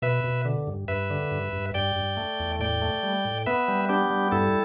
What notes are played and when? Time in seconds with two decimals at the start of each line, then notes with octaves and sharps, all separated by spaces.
0.02 B2 B4 E5
0.24 B2
0.45 D3
0.67 G2
0.88 G2 B4 E5
1.10 D3
1.31 G2
1.53 G2
1.74 G2 D5 G5
1.96 G2
2.17 A3
2.40 E2
2.60 A2 D5 G5
2.82 A3
3.03 G3
3.25 A2
3.46 B3 B4 E5
3.68 G3
3.89 B3 D4 G4
4.10 G3
4.32 G2 E4 A4